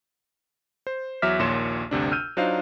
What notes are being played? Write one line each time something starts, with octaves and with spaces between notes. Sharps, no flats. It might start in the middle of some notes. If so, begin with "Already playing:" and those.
C5
E2 F#3 E5 D6 F6 B6
A#1 D#2 A#2 C#5 C6 E7
G1 D2 C3 D4
E6 F6 G6 D#7
F#3 D4 D#4 F4 C5 F5